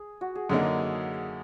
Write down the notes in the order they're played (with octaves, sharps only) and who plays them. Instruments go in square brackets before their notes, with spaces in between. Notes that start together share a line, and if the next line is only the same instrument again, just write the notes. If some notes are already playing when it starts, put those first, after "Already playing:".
Already playing: [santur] G#4
F#4
G#4
[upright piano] F#2 D3 F#3 A#3 D#4 [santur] G#4